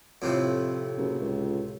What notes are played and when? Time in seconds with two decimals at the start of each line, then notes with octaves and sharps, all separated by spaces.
0.22 F2 A2 C3 F3
0.97 F#1
1.21 C#2